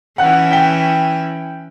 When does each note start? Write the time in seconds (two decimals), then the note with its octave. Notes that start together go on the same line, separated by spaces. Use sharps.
0.18 E3 C#4 E4 F#5 F#6
0.51 G5 B6 G7